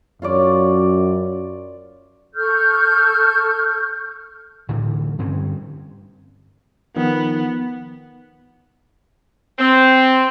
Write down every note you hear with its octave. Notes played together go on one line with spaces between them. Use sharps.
F#2 F4 C#5 D5
A4 C#6 F6 G6
A2 D3 E3
G2 D3 C4 C#4
D#3 F3 B3
C4